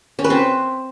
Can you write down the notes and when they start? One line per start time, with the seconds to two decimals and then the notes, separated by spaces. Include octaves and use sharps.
0.19 C#4
0.24 B4
0.30 C4